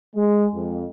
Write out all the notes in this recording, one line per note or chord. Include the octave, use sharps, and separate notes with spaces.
G#3
F2